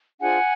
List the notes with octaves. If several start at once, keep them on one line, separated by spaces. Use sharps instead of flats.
D4 F4 G#4 C5 F#5 G#5